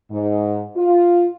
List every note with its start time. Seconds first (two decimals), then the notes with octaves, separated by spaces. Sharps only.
0.11 G#2
0.76 F4